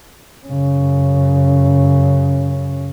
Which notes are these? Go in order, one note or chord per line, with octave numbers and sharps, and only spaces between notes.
F#2 C#3